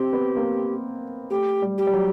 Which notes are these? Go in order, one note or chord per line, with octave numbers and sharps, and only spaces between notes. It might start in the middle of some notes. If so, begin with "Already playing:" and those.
Already playing: C4 G4
B3
A#3
A3 G4
G3
G4
G3
F#3